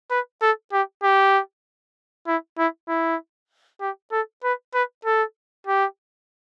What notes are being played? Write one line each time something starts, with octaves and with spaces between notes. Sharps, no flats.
B4
A4
G4
G4
E4
E4
E4
G4
A4
B4
B4
A4
G4